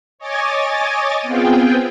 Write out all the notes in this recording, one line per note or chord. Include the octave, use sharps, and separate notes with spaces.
C#5 D#5 G#5 D6 A6
B3 C4 F4 G#4 G5